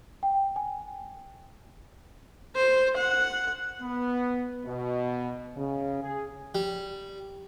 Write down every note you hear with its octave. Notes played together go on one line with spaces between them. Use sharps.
G5
G#5
C5
F#5
B3
B2
C#3
G#4
G3